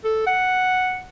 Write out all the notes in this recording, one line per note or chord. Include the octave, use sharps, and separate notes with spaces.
A4
F#5